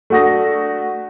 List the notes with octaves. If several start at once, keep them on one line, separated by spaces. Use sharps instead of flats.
A3 D4 F#4 D#6 A#6